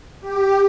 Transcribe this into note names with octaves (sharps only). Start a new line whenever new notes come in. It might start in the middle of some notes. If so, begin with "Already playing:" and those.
G4